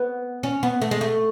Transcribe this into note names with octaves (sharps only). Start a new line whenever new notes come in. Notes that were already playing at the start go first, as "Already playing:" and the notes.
Already playing: B3
C#4
B3
A3
G#3
A3